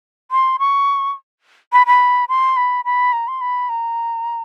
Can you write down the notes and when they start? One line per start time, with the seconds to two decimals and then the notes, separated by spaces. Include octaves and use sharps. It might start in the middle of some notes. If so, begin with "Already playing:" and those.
0.31 C6
0.59 C#6
1.73 B5
1.87 B5
2.29 C6
2.57 B5
2.85 B5
3.13 A#5
3.28 C6
3.41 B5
3.69 A#5